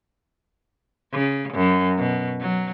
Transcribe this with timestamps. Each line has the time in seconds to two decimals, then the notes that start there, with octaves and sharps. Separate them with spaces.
1.13 C#3
1.54 F#2
1.98 B2
2.41 F#3